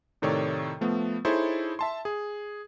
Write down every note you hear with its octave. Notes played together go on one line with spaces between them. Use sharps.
A2 C3 D#3 A4 C#5 D5
F3 A3 B3
D#4 E4 G#4 A4 C5 C#5
E5 A5 C6
G#4